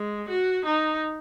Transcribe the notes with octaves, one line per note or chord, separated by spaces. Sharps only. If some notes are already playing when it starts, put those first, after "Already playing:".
Already playing: G#3
F#4
D#4